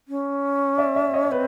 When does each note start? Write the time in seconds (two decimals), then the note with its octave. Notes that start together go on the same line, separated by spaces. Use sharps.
0.08 C#4
0.78 D5 E5
0.96 D5 E5
1.14 C#5 D#5
1.31 C4 B4 C#5